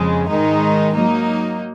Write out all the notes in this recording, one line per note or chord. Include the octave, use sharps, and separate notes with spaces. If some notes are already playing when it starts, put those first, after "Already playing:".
Already playing: F2 C#3 G#3
G#2 D#3 G#3 D#4
F#3 A#3 D#4